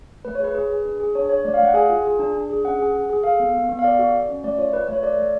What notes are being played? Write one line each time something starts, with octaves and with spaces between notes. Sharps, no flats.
A3 B4
C#5
G#4 B4
G#4 B4
G#4
D4
G#4
D4 C#5
D4 C#5
A3 D5
F5
A3
F#5
G#4 G#5
F4
G#4
D4
D4
G#4
C#4 F#5
G#4
G#4
G#4
A4 F5
B3
B3
B3
F5
A4 D5
F#4
F#4
C#4
A3 D5
F4 C#5
F4 B4
B4
A3 C#5
A4 D5
A3